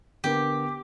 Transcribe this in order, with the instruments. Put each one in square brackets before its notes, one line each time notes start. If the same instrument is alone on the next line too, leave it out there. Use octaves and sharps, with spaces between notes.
[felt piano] D3 B3 A#4 [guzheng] G4